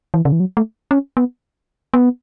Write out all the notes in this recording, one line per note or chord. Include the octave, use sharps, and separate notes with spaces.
E3
C#3
E3
F#3
A3
C#4
B3
B3